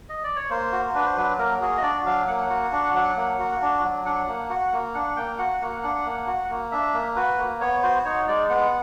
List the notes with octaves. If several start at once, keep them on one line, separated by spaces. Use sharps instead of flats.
D#5
D5
C#5
A#3 C5
F#4
D4 B4
C5
F#3 B4
A#3 A#4
F#4 G#4
D#5
D4 D5
F#3 F5
A#3 F#5
F#4
D4
F#3
A#3
F#4
D4
F#3
D4 F#5
A#3
F#4
A#3
D4 F#5
A#3 G5
F#4 F#5
A#3 F#5
D4 F#5
A#3
F#4
A#3
D4 E5
A#3
F#4 B4
A#3
B3 C#5
F#4 C5
D#4 C#5
G#3 D5
B3 F#5